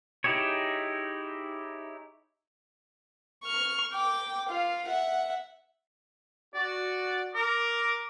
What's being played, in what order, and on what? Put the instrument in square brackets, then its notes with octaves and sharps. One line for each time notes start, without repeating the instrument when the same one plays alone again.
[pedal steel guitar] D#4 E4 G4 G#4 C#5
[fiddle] C#6 F6
G5 D6
F4 F5
E5 F#5
[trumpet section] F#4 [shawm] D5
[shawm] A#4 [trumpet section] D6